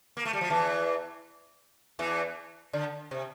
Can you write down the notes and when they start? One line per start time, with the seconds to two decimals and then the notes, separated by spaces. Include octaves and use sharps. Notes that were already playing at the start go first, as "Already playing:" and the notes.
0.17 A#3
0.25 A3
0.33 G3
0.41 F3
0.50 E2 E3
1.99 E2 E3
2.73 D3
3.11 C3